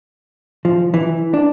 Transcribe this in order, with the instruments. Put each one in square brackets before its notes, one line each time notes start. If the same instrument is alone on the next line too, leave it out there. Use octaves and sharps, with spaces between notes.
[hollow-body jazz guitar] F3
E3
D4